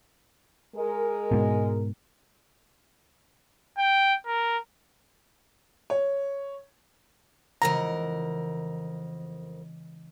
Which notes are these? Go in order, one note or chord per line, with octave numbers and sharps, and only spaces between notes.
G#3 A#4
G#2 B2
G5
A#4
C#5
F2 C#3 E3 G#3 A#4 F#5 A#5